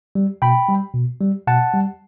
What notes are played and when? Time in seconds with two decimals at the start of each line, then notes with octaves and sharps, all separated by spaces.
0.15 G3
0.42 B2 G5 B5
0.69 G3
0.94 B2
1.21 G3
1.47 B2 F#5 A5
1.74 G3